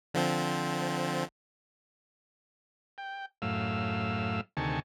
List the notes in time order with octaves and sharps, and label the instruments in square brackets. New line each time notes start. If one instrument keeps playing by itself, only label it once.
[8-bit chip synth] D3 F3 C4
[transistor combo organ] G5
F#2 A2 F5 E6
D2 C3 D#3 G#5 A5 C#6